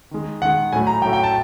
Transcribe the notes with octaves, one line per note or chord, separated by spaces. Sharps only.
D#3 G#3
D#3 G#3 F#5
A2 F#3 A3 G#5
A#5
A2 F#3 A3 G5
G5
A5